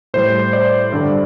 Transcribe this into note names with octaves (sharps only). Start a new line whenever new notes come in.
A2 G3 C5
D5
G2 D3 G3